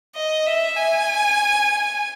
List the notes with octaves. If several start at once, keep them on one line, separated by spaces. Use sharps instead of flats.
D#5
E5
G#5